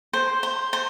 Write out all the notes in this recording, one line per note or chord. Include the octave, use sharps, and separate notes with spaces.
C5
C5
C5